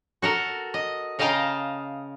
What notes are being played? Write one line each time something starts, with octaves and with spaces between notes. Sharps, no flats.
F#4 A4 A#4
D#5
C#3 D#5 F5 G5 A5 A#5